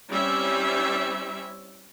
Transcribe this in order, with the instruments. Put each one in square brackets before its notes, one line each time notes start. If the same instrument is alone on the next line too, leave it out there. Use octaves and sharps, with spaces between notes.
[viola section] G3 C4 C#4 E4 E5